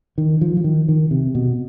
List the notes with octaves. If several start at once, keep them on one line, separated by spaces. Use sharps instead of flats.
D#3
F3
F3
D#3
D#3
C3
B2